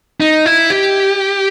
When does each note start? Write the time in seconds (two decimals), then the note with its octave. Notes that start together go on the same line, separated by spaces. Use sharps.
0.20 D#4
0.46 E4
0.70 G4